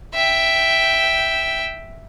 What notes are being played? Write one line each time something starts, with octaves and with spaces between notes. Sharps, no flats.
E5 G5